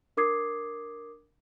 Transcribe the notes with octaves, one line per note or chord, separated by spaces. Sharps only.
D4 A#4 D6 D#6 G#6 C7